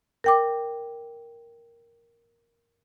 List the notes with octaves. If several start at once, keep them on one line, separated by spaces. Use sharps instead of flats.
A#4 G5 D6